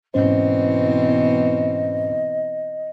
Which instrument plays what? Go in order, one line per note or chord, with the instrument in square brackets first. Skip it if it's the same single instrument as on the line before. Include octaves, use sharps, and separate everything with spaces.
[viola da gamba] E2 B2 C4 [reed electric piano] G#2 C#4 C5 [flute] D#5